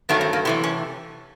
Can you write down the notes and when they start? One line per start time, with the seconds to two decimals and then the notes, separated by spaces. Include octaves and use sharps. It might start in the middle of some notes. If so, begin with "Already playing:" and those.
0.09 G2 D#3 F#3 A3 B3
0.21 C4
0.33 A#3
0.45 C3 E3 A3 B3
0.64 C#4